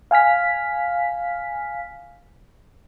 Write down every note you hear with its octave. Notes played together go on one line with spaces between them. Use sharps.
F5 G#5 F6 B6